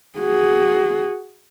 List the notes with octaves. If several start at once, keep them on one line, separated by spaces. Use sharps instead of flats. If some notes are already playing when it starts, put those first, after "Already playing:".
F#4 G#4